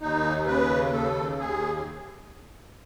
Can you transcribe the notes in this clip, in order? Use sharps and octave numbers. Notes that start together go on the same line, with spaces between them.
D#2 D#4
C#3 B4
D#2 A4
D#2 G#4